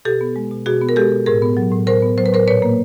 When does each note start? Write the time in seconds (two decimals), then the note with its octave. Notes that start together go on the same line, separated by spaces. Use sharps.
0.05 B2 G4 A4
0.21 B3
0.36 G#3
0.51 B2
0.66 B2 F#4 G#4
0.82 B3
0.89 A#4
0.96 G#3 G4 A4
1.12 B2
1.26 A2 G#4 A#4
1.42 B3
1.57 F#3
1.72 A2
1.87 A2 A#4 C5
2.02 B3
2.18 F#3 C5
2.26 B4
2.33 A2 A#4 C5
2.48 A#2 B4 C#5
2.62 A#3